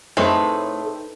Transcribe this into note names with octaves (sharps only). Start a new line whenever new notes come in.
A2 A3 C4 D#4 G#4 B4 C#5